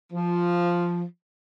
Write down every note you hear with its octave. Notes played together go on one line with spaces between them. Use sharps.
F3